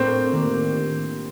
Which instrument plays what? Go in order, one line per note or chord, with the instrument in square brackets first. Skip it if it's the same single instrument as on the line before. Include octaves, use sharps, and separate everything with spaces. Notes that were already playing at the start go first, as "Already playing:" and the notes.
Already playing: [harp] A2 A3 D4 F4 A#4 [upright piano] C4
[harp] D#3 A#3 D4 G4